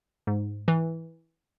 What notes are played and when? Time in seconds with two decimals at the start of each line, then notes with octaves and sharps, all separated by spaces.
0.27 G#2
0.68 E3